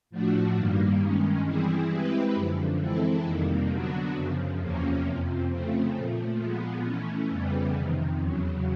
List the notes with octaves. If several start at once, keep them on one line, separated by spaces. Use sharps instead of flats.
A2 F3 A3 D4 F#4
G2 D#3 G3 A#3
G2 D#3 G#3 C#4
E3 G3 C4 E4 G#4
G#3 C4 E4 G4 B4
F#2 D3 F3
E3 G#3 C4 E4 A4
F2 C3 D#3 G3 A#3
D3 F#3 B3 D4 F#4
F#2 C#3 F3
E2 C3 F3 A#3 C#4
F2 C3 F3
C#3 F3 A3 C4
A#2 F3 A3
A#2 F3 G#3 B3
E3 A3 C#4
F2 C#3 E3 G3 B3
F2 C3 D#3
E2 C#3 F#3